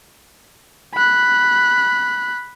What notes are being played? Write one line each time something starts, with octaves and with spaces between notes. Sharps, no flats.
B5 F#6